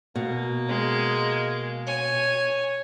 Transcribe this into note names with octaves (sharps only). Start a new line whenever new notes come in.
B2 A#3
G#3
C#5 G#5